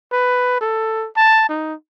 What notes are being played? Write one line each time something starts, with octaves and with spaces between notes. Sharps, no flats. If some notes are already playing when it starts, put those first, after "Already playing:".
B4
A4
A5
D#4